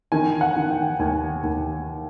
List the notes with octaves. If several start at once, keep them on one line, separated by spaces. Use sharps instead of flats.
D#3 G#5
F#5
D#3
G5
D#2 G#5
D#2